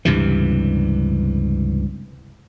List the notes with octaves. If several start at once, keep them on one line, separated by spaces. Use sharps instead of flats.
C#2 G2 C3 E3